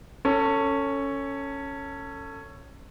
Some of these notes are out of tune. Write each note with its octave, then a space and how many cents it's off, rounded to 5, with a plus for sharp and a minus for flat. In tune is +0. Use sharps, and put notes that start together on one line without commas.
C#4 +0 A4 +25